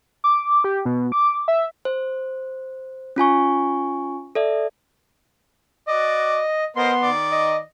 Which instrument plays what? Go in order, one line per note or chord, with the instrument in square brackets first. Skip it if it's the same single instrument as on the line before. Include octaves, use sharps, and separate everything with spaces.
[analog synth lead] D6
G4
B2
D6
E5
[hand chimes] C5
C#4 F4 G#5 C#6
A4 D5 E5
[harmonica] F#4 D5 [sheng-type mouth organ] D#5
[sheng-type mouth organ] B3 C6 [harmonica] A#4 C5 D#5
[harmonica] D#3 D5
[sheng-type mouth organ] D#5